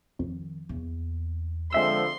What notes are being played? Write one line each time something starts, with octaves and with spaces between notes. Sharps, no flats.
F2 D#3
E2 A#3
D3 F3 G#3 C4 E5 C6 E6